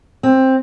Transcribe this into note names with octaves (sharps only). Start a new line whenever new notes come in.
C4